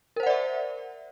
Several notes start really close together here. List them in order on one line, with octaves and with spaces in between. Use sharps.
A#4 C5 F#5 D5 E5